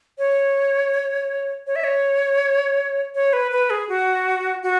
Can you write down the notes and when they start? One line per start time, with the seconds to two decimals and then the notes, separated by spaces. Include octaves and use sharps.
0.18 C#5
1.67 C#5
1.76 E5
1.84 C#5
3.15 C#5
3.33 B4
3.51 B4
3.70 G#4
3.89 F#4
4.63 F#4